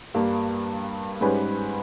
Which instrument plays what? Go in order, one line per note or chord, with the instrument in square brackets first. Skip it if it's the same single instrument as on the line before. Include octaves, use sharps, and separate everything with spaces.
[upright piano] G2 G3 A#3
G#2 G3 C#4 G#4 B4